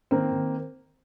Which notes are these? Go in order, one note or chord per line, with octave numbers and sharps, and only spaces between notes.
D#3 A#3 C4
D#3